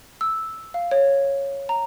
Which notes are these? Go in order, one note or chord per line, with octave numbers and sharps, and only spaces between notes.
E6
F5
C#5
A#5